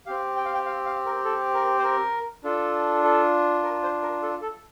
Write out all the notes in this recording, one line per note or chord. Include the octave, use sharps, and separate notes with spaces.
C4 G4 F5
G5
F5
G5
F5
F5
A#4
A4
A#4
C5
A#4
D4 F4 A4
A4
A#4
C5
A#4
A4
A4